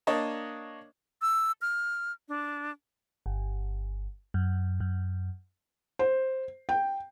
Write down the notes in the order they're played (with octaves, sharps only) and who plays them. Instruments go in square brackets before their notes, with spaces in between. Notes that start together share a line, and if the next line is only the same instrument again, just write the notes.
[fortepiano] A#3 D4 C#5 D#5 A5
[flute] E6
F6
D4
[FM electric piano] G1
F#2
F#2
[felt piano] C5
G5